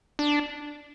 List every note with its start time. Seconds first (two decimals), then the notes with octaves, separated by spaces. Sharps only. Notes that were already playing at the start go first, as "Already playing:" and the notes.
0.19 D4